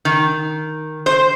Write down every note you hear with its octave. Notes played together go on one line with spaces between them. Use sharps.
D#3
C5